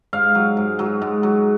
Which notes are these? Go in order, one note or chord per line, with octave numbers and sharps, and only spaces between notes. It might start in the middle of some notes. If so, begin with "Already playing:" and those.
G#2 F5
F#3
G#2
F#3
G#2
F#3